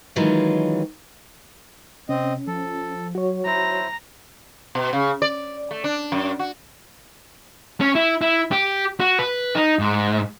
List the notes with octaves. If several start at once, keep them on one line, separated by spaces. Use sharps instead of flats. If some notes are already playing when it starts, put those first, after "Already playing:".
D#3 E3 F#3 G#3 C#4 F4
C3 C4 C#4 D#5
F3 A4
F#3 F#4 C#5
F#3 E4 C5 A#5
B2
C#3
D5
A3
D4
F#2
F#4
C#4
E4
E4
G4
F#4
B4
D#4
G#2